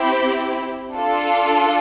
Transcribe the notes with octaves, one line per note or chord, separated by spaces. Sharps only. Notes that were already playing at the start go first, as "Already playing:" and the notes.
Already playing: C4 E4 G4
D4 F4 A4